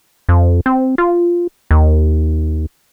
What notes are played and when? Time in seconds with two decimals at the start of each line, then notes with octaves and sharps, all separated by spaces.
0.29 F2
0.66 C4
0.98 F4
1.71 D#2